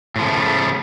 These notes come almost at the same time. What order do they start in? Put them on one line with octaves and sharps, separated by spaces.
A2 F3 C#3 A3